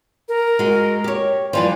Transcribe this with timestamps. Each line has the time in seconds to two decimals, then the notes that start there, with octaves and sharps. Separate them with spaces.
0.28 A#4
0.59 G#3 F#4
1.04 G4 C#5
1.53 G2 E3 F3 D5 C6